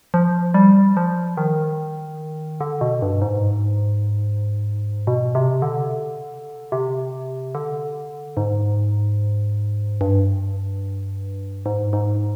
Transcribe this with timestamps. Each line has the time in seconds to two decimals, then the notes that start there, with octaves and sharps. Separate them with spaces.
0.14 F3
0.54 G3
0.97 F3
1.37 D#3
2.61 D3
2.81 B2
3.02 G2
3.22 G#2
5.07 B2
5.35 C3
5.62 D3
6.72 C3
7.55 D3
8.37 G#2
10.01 G2
11.66 G#2
11.93 G#2